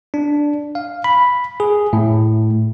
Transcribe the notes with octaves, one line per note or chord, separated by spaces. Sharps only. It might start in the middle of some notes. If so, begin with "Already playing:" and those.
D4
F5
B5
G#4
A2